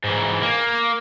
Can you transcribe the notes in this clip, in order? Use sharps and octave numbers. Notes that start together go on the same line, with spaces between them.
G#2 E3
A#3